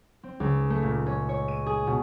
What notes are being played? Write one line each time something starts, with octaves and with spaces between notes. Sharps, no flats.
C4
C#2
A3
A#2
C#4
C#5
D#7
G#4
B2